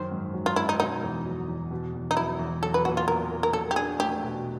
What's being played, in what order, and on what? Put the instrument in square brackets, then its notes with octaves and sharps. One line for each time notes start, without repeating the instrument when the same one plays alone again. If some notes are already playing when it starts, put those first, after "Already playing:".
Already playing: [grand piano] F#2 D#3 [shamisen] C5
[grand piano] G#2
F#3
[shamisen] F4
[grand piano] G#2 [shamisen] E4
[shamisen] D#4
[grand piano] B2 [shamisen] D#4
[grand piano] E2
F#3
E2
B2
E2
[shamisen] D#4
[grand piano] F#3 [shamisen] E4
[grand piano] E2
[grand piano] F#3 [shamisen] A4
[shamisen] B4
[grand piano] A#2 [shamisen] F#4
[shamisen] F4
[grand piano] B3 [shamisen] A#4
[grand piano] A#2
[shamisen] A#4
[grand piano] F#3 [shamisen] A4
[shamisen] G4
[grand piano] D4 [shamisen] G#4
[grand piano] A3 [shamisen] G4
[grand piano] B2